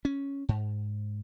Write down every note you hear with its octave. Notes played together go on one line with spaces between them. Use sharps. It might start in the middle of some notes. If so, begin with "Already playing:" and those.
C#4
G#2